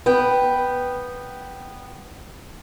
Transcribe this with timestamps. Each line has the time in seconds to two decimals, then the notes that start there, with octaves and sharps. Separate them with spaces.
0.06 B3 G5